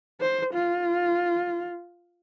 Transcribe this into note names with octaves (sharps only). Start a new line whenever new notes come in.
C5
F4